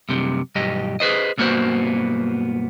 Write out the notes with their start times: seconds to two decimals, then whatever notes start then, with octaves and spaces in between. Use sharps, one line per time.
0.09 F#2 C3 G3
0.55 B1 G2 G4 D#5
1.00 G#4 B4 C5 D#5
1.38 B1 G2 A#3 B3 F#4 C5